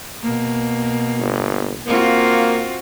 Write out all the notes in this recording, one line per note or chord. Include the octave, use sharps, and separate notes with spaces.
B2 A#3
G1
A#3 C4 F4 F#4